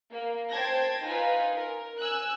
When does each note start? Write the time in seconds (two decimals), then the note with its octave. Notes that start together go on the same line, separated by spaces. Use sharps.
0.12 A#3
0.50 C5 G5 A5 G#6 A#6
1.06 D#4 F4 B4 G#5
1.53 A#4
1.99 G#5 E6 F#6